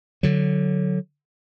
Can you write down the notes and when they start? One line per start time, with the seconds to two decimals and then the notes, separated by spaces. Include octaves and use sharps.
0.23 D3 F#3